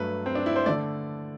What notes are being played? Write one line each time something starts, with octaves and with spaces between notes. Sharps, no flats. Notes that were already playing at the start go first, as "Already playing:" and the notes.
Already playing: G2 F#3 A3 B4
C4
D4
E4
C5
D3 A3 D5